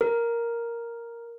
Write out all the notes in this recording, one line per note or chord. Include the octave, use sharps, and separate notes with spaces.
A#4